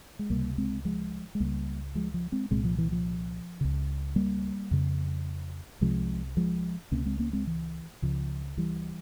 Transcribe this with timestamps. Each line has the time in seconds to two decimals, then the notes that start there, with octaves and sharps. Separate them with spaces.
0.19 G#3
0.30 C#2 C3 G3 A#3
0.58 G#3 C4
0.85 F3 G#3
1.35 G#3
1.40 C#2 C#3 G3 A#3
1.95 F3 G#3
2.14 F3
2.32 G#3 C4
2.51 C2 A#2 G#3 C4
2.65 F3
2.78 E3
2.92 F3
3.61 C#2 C#3
4.16 G3 A#3
4.71 F2 C#3
5.81 C2 C3 F3 G#3
6.37 F3 G#3
6.91 C#2 C3 A#3 C#4
7.06 G#3 C4
7.19 A#3 C#4
7.33 G#3 C4
7.47 E3
8.02 C#2 C#3 F3
8.57 E3 G3